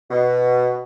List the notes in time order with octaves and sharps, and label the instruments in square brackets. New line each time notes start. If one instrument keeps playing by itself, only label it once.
[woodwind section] B2